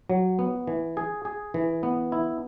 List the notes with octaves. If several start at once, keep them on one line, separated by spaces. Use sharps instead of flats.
F#3
B3
E3
G#4
G#4
E3
B3
E4